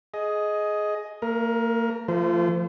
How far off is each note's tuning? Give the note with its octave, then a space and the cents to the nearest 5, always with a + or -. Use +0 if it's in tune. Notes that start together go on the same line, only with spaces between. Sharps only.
G#4 +20 D#5 +10
A#3 -35 A#4 +20
F3 -15 A3 +25 C5 -35